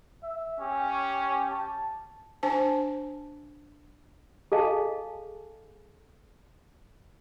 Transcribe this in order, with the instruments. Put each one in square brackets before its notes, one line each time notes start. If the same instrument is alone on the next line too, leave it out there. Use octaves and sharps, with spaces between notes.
[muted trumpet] E5
[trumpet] C#4 [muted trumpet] G4
[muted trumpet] A5
[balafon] D4 C5 G#5 A5
[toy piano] G#4 A4 D#5 F5 G#5 A5